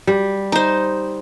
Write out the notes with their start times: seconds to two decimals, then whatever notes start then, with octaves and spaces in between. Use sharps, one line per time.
0.07 G3
0.52 D#4 C5